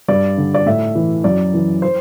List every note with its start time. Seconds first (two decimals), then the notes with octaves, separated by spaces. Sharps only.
0.08 G2 D5
0.38 D3
0.54 D5
0.66 A2 E5
0.95 E3
1.24 F#2 D5
1.54 E3
1.82 C5